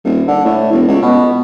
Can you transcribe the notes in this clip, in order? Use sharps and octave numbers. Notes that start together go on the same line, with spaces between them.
D#1
D3
A2
E1
C#2
B2